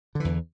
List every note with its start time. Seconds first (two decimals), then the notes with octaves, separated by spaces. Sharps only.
0.15 D3
0.20 E3
0.25 E2